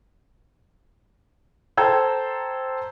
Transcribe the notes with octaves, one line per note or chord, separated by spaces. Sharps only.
A4 C5 G5 A#5 G#6